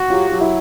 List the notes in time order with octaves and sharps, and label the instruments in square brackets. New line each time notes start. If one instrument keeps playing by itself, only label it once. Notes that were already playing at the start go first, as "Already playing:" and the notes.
Already playing: [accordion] F#4
[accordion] F#3 [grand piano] F4 G4
[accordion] F#3 [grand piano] G4
[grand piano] E4 F#4